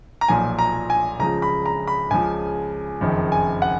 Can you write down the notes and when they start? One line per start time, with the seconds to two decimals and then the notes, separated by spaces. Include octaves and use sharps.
0.21 A#5
0.28 B1 A#2 F3 G#5
0.59 A#5
0.90 G#5
1.20 C#2 C#3 F3 A#5
1.42 B5
1.66 A#5
1.87 B5
2.11 C#2 C#3 F3 G#5
3.01 F#1 F2 D#3
3.32 G#5
3.62 F#5